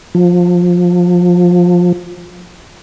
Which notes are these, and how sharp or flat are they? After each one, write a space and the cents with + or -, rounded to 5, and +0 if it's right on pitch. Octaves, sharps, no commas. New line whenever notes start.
F3 +20